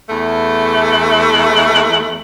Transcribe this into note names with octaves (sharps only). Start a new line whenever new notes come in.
E2 A3